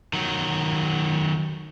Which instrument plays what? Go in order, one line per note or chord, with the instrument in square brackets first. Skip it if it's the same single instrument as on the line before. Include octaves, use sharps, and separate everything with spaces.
[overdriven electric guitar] D#3 F#3